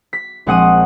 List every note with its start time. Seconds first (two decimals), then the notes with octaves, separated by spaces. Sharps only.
0.13 B6
0.47 A#1 G#3 C4 F#5 D#6 D#7